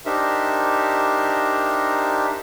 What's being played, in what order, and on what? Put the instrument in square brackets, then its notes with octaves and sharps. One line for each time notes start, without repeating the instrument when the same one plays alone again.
[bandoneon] D4 D#4 G4 A#4 C5 E5